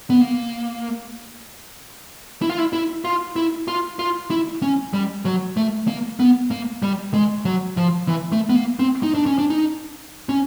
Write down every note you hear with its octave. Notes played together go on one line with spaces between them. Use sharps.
B3
A#3
E4
F4
E4
E4
F4
E4
F4
F4
E4
C#4
G3
F#3
A3
A#3
B3
A#3
G3
G#3
F#3
F3
E3
A3
B3
A#3
C4
D#4
D4
C#4
D4
D#4
C#4